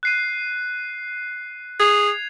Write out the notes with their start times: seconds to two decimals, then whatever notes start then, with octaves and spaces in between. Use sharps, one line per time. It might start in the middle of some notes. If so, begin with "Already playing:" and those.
0.03 F#6 C7 D#7
1.80 G#4 G#6 C7 F7